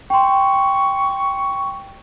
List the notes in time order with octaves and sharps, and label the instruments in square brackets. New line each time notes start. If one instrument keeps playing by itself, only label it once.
[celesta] G5 C6 [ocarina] C#6